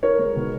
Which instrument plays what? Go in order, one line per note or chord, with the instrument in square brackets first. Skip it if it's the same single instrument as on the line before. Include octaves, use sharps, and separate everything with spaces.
[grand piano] D#4 A#4 C#5
G#3
B2